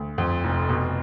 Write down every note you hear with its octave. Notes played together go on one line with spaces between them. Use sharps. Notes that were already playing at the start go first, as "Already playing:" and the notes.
Already playing: D2
F2
F1
B2